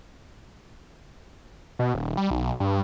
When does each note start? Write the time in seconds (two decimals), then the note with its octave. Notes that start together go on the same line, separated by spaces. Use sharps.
1.79 B2
1.94 D#1
2.17 G3
2.30 B1
2.60 G2